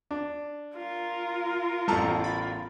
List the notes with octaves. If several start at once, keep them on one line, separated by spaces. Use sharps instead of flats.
D4
F4 A#4
A1 E2 G3 A4 A5 A#5
B5 A6